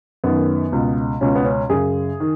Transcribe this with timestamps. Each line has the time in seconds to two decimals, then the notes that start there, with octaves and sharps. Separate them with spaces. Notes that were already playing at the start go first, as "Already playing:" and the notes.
0.24 F#2 D#3 B3
0.72 C#2 B2
1.21 C#2 B2 C#4
1.35 B3
1.45 C#4
1.69 F#2 C#3 G#4
2.20 D#3